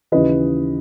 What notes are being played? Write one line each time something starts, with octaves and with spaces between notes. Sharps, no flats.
D#2 C#3 E3 B4 D#5